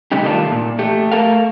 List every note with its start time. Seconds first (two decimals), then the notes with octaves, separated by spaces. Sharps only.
0.12 C3 G3 A3 C#4 D#4 G4
0.24 C3 D#3 G3 A3 D4 F4
0.52 A#2
0.79 A3 G4
1.12 A3 A4 A#4 F5